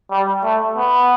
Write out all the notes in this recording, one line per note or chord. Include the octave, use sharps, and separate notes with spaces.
G3
A3
B3